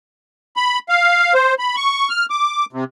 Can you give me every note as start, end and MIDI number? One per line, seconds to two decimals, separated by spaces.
0.56 0.79 83
0.89 1.34 77
1.34 1.54 72
1.59 1.76 83
1.76 2.09 85
2.09 2.26 89
2.30 2.65 86
2.73 2.84 48